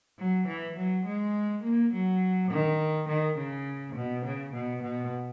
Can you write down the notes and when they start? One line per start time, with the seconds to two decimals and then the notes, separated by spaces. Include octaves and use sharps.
0.19 F#3
0.47 E3
0.76 F#3
1.06 G#3
1.64 A#3
1.93 F#3
2.51 D#3
3.09 D#3
3.38 C#3
3.95 B2
4.25 C#3
4.53 B2
4.82 B2